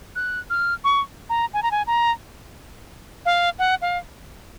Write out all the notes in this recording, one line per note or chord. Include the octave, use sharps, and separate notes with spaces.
F#6
F6
C#6
A#5
G#5
A#5
G#5
A#5
F5
F#5
F5